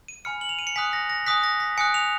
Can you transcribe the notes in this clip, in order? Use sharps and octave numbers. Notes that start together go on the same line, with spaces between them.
D#7
G#5 B5 F6 C#7
F#7
F7
D#7
C#7
G#5 D#6 F#6 B6
A#6
A#6
G#5 D#6 F#6 B6
A#6
B6
G#5 D#6 F#6 C#7
F7